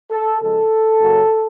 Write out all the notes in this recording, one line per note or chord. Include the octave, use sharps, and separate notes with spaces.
A4
C#3 F3 G#3 A4
F#2 C#3 F#3 A#3